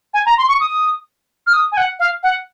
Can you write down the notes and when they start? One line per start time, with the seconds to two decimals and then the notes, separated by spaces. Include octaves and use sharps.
0.14 G#5
0.26 A#5
0.38 C6
0.48 C#6
0.60 D#6
1.47 F6
1.53 D#6
1.72 G#5
1.77 F#5
1.99 F5
2.23 F#5